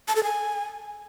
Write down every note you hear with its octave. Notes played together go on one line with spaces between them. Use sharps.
A5
A4
G#5